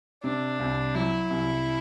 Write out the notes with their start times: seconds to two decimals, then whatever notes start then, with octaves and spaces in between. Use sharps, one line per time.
0.24 C3 D4
0.59 C2
0.95 F#3 E4
1.30 C2